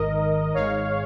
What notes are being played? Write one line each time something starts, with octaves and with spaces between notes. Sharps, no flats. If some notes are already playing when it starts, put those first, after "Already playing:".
Already playing: G#1 G#2 D#3 A#4 D#5
G#1 G#2 G#3 C#5 F5